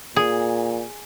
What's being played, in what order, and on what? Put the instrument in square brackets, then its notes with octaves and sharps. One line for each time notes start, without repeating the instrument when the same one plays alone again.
[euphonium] A#2 [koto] G#4